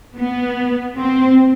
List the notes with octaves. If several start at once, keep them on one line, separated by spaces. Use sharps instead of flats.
B3
C4